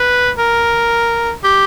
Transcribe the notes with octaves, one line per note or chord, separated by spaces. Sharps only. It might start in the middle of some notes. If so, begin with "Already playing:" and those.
Already playing: B4
A#4
G4